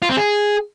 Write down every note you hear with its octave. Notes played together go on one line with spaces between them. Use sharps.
F4
C4
G#4